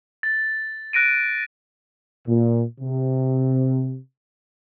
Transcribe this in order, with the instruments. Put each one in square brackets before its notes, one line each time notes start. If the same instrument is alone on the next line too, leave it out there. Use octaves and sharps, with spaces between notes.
[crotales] A6
F#6 A#6 D7 D#7
[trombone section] A#2
C3